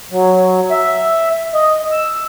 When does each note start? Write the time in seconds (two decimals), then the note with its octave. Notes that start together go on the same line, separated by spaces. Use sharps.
0.11 F#3
0.70 E5
1.54 D#5
1.92 E6